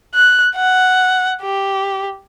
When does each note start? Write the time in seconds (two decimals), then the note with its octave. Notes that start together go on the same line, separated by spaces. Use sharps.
0.15 F#6
0.55 F#5
1.42 G4